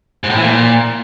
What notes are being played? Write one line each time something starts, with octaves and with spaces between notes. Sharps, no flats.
G#2
A2
E3
A#2